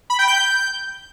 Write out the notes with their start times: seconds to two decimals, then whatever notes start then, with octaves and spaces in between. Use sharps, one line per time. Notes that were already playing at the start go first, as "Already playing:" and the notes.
0.10 B5
0.19 G5
0.28 G6